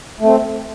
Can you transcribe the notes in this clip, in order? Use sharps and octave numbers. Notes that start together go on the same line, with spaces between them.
A3 C4